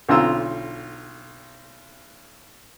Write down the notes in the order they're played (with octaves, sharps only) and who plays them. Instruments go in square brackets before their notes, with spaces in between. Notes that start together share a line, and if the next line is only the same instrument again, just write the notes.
[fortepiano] B1 D3 C4 F4 A#5 E6